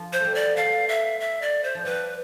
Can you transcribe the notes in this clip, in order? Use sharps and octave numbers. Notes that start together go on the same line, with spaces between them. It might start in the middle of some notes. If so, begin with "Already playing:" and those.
Already playing: F3
C5
G3 A3
D5
B3
A3 F5
E5
E5
D5
C5
F3
G3 B4